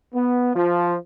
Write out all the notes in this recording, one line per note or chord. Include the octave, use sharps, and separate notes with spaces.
B3
F3